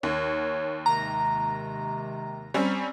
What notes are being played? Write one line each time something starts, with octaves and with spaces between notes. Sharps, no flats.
D#2 C#5
C3 D#3 G#3 A#5
G3 C4 C#4